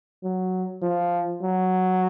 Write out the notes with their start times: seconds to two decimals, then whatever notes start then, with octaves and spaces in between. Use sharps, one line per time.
0.24 F#3
0.82 F3
1.42 F#3